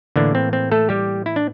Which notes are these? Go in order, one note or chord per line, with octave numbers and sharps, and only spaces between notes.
A2 D3 E3 A#3 D4
C4
C4
A3 A4
G3 G4
E4
D4